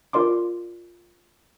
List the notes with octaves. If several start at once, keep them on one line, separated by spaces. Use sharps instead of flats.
F4 A#4 D5 C6 D6